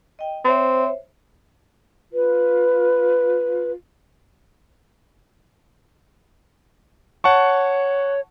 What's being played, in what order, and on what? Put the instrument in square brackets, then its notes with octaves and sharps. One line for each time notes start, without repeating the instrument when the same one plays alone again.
[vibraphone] D#5 G5
[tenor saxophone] C4 [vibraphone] C5 C#5 E5
[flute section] F4 B4
[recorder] C#5 [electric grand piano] F#5 A5 C#6